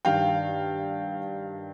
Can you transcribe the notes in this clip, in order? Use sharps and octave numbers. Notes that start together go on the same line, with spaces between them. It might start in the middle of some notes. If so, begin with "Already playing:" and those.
G2 D#3 F5 G5